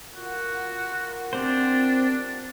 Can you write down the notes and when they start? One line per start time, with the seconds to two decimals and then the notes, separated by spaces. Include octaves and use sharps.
0.16 F4 F#4 A#4 F#5
1.33 C4 D4 G4 C5